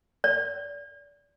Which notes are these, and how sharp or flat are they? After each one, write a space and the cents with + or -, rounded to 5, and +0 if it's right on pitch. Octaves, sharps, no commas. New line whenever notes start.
D5 -25